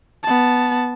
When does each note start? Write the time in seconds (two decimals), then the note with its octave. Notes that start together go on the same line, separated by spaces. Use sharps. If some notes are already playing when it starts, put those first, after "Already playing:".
0.23 B3 A5